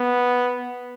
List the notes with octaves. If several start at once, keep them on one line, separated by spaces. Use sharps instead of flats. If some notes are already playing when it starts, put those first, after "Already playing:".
Already playing: B3